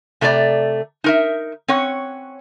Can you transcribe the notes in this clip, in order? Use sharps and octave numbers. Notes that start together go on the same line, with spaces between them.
C3 A3 D#4 A#4 D5 A#5
D#4 A#4 E5
C4 C#4 C#5 F#5